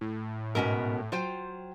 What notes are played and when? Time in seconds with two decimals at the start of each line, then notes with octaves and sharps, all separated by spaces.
0.01 A2
0.55 G#2 B2 B3 C#4 A#4
1.12 F#3 F4 C5 G5